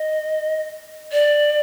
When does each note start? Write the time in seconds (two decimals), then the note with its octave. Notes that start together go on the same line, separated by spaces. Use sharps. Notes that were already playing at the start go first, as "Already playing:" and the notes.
Already playing: D#5
1.12 D5